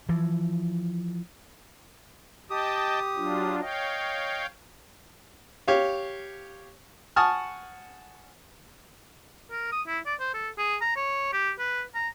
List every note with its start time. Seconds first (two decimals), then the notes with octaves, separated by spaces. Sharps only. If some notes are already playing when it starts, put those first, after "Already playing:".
0.09 E3 F3
2.50 G4 D#5 G5 A5 D#6
3.16 F#3 D4 F4
3.61 C#5 D#5 F5 G5
5.68 G4 C#5 F5
7.16 F#5 G#5 A5 C#6 D#6 F6
9.51 A#4
9.72 D#6
9.88 E4
10.06 D5
10.20 C5
10.34 A4
10.58 G#4
10.81 A#5
10.96 C#5
11.33 G4
11.59 B4
11.95 A#5